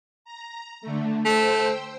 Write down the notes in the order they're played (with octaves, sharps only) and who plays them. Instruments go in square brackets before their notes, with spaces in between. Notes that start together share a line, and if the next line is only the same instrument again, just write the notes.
[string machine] A#5
D3 A3
[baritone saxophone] A3 [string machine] C5 G5 E6